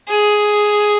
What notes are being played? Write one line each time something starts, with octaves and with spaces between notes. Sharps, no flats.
G#4